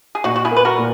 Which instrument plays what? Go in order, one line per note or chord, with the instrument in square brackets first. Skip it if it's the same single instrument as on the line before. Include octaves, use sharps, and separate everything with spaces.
[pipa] G#4
[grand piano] A#2 [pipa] D#4 F#4
[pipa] F#4
E4 G#4
[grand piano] A#3 [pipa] B4
[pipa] F#4 A#4
[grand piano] A#2